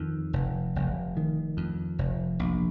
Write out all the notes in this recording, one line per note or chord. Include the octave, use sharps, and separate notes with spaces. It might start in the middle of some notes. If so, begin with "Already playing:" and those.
Already playing: F2 D#3
F1
F1
D#3
F2
F1
A#1